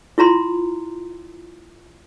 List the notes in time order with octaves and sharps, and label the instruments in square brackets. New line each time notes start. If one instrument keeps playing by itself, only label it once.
[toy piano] E4 F4 A#5 C6